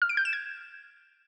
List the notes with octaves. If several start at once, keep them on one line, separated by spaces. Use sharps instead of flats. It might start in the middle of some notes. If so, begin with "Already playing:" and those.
F6
D7
G6
E7
G#6